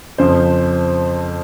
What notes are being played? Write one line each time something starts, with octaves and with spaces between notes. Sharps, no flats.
F2 C#3 F3 C5